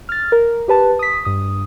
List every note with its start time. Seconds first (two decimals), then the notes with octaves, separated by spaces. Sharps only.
0.09 F6 A6
0.32 A#4
0.68 G4 B4 A5
0.99 D#6 B6
1.25 G2 D#6